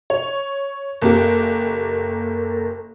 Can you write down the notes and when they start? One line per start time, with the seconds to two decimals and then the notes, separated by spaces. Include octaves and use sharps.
0.10 C#5
1.02 F#1 A#3 G4 A4 A#4